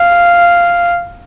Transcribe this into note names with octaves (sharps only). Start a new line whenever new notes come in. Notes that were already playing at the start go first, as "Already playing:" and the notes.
Already playing: F5